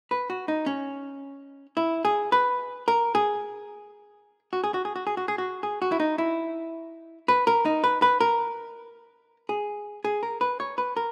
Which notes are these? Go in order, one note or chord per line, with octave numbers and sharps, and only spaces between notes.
B4
F#4
D#4
C#4
E4
G#4
B4
A#4
G#4
F#4
G#4
F#4
G#4
F#4
G#4
F#4
G#4
F#4
G#4
F#4
E4
D#4
E4
B4
A#4
D#4
B4
B4
A#4
G#4
G#4
A#4
B4
C#5
B4
A#4